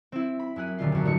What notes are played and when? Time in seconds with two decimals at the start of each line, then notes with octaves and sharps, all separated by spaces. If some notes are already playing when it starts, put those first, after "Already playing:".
0.12 C4 E4
0.39 B5
0.56 F#2 E4 G#4 F#6 D#7
0.78 D#1 B1 D3 F4 C7
0.92 A#1 F#2
1.05 G1 F#3 A3 D#4 C#7